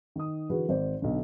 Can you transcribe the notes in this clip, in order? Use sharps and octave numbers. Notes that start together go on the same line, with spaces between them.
D#3 D#6
D3 E3 F#4 G#4 B4
G#1 C5 D5
B1 D3